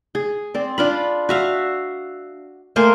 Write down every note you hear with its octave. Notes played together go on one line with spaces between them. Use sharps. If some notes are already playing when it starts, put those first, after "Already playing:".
G#4
C4 D5
D4 F4 B5
F#4 E5 F5
A3 A#3 C5 G#5